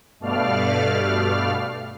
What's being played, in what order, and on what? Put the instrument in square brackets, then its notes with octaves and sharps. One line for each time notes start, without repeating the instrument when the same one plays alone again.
[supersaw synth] G2 B2 A3 D5 F5 F6